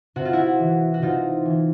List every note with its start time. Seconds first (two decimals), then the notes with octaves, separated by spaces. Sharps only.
0.16 C3 F#4
0.25 F4
0.33 E4 F#4
0.59 E3
0.94 F#4
1.02 C3 D#4 F4
1.45 E3